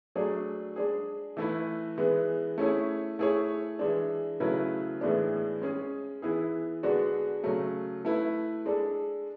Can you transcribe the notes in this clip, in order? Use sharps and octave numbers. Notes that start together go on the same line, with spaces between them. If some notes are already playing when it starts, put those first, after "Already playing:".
F#3 A3 D4 G#4
G#3 D4 G#4
E3 A3 E4 B4
E3 G#3 B3
A3 C#4 E4 G#4 C#5
A3 E4 G#4 C#5
E3 G#3 D4
C#3 F#3 A3 E4 B4
A2 E3 G#3 B3 D4
G#3 C#4 G#4
E3 B3 E4 G#4
D3 G#3 B3 D4 F#4
C#3 F#3 A3
A3 E4 B4
G#3 D4 A4